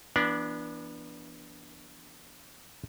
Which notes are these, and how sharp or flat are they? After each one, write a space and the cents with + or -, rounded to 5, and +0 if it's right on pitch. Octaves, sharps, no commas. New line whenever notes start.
E3 +30 B3 -30 D4 +0